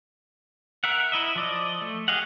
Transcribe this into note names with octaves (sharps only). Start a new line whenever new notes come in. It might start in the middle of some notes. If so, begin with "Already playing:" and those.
A#4 E5 F#5
E4 D#5 E5
F3 D5 D#5
A3
G4 G#4 D#5 F5 F#5